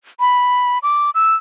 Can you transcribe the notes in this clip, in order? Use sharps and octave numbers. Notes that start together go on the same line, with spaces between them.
B5
D6
E6